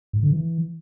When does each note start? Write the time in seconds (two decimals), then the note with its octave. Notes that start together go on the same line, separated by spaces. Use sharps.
0.13 G#2
0.23 D3
0.32 E3